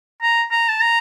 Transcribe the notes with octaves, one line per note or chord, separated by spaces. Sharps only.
A#5
A#5
A5
A#5